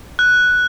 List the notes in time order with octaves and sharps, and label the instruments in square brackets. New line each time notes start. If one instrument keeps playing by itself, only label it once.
[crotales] F#6